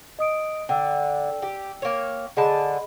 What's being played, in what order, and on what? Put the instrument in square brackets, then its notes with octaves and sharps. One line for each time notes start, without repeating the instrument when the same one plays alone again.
[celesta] D#5 D#6 D7
[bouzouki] D3 [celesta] G5 E6
[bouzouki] G4
A#3 C#5
[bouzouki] D3 G#3 A5 [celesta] G#4 D#5 B5